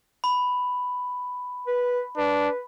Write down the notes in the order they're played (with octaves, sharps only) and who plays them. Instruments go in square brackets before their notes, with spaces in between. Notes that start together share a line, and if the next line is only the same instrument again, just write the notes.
[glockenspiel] B5
[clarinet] B4
[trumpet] D4 [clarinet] B4